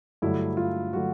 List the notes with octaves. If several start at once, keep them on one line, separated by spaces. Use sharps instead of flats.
G2 D3 F#3 A3 E4
F4
D3 F#3 A3 F#4